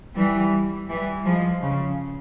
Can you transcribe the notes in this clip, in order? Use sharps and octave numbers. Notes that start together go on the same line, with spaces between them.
E3 G3
E3 G3
F3 G#3
C#3